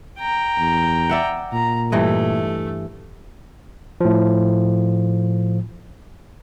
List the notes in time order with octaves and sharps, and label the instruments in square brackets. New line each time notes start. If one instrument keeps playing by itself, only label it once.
[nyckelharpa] G5 A#5
[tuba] E2
[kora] D5 E5 F#5
[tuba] A#2 [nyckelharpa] A#5
[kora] G2 E3 D#5 [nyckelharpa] A3
[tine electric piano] A2 F3